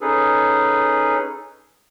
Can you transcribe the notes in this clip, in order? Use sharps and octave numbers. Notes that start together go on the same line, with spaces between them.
C#4 D#4 G#4 A4 B4